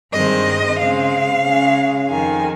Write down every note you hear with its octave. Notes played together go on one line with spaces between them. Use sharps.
G2 D#3 G#3 C4 D#5
C#3 G#3 C4 F5
C#3 G#3 C#4
F2 D#3 G#3 G#5